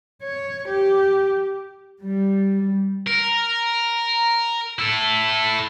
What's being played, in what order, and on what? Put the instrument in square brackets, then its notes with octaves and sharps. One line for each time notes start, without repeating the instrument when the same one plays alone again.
[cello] C#5
G4
[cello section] G3
[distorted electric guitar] A#4
E4 A4